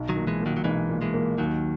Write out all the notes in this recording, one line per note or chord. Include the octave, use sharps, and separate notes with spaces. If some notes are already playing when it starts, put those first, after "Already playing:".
Already playing: B1
D#3 F#3
A#2
E3 G#3
A#2
D#3 F#3
F#3
B1 E3 G#3
A#2
E3 G#3
A#3
D#2 D#3 F#3